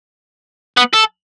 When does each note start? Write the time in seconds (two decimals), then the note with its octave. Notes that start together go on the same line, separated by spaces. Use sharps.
0.77 B3
0.93 A4